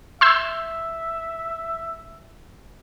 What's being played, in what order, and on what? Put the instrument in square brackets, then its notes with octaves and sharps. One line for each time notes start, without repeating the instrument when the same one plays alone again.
[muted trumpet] E5 [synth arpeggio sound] C6 E6 G6